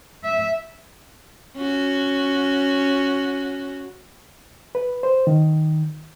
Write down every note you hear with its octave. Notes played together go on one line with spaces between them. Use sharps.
E5
C#4 F#4
B4
C5
D#3